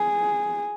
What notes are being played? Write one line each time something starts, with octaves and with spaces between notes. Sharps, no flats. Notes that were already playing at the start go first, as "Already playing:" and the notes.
Already playing: G#4